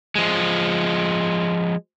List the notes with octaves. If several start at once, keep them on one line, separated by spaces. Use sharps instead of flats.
F3 G#3